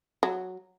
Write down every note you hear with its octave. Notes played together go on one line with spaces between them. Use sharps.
F#3